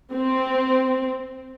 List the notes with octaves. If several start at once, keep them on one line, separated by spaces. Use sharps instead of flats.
C4